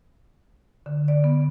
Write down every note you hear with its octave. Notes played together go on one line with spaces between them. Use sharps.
D3
D5
B3